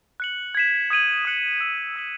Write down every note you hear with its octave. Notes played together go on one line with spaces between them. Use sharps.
F#6 C#7 F#7
G#6 B6 E7
D#6 G#6 D#7 F#7
D#6 F#6 C#7 F#7
E6 G#6 C#7 F#7
E6 B6 F#7